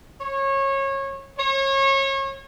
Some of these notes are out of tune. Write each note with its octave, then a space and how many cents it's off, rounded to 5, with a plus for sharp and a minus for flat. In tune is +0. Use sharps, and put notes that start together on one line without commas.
C#5 -25
C#5 -30